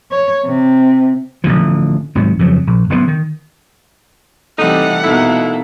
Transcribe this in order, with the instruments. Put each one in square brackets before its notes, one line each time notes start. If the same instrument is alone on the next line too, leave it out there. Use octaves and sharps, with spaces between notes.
[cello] C#5
C3
[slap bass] A1 A#2 D3 F3
C2 G#2 D#3 F#3
F2 C#3 F#3
A#1
F#1 A2 C#3 B3
D#3
[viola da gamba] C3 E3 G3 [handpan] A3 A4 [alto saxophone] D#4 [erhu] F#5
[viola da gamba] B2 [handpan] A#3 D#4 A4 [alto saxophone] E4